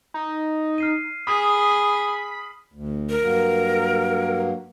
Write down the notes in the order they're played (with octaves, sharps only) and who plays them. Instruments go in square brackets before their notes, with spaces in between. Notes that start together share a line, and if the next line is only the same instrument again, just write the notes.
[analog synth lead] D#4
[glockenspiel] F6 C7 D#7
[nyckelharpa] G#4 [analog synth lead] B5 [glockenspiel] D#6
[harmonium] D2
[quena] A#4
[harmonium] G2 F#3 A#3